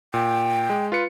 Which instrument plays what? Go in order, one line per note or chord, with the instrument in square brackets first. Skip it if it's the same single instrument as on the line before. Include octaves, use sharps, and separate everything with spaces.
[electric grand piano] A#2 [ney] G5
[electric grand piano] G#3
F4 B4 C#7